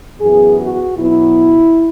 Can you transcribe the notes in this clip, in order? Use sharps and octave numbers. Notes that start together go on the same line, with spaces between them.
F#2 E3 B3 G#4
F#4
B2 F#3 B3 E4